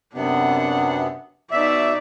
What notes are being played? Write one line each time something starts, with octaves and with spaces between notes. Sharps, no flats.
F#2 C3 B3 D4 F#5
B2 D#4 D5 E5